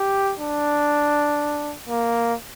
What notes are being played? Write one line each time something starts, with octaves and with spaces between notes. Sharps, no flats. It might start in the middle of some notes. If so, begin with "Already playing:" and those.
Already playing: G4
D4
A#3